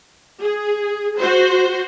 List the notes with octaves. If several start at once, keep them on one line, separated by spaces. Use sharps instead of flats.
G#4
F#4 C5